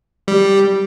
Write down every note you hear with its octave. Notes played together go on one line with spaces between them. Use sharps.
G3